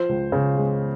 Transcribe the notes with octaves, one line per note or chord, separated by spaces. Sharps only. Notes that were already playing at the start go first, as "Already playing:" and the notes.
Already playing: F3 C5
C#2
C#3
G#3